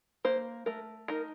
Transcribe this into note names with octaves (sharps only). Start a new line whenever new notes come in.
A#3 C5
A3 A#4
D#4 A#4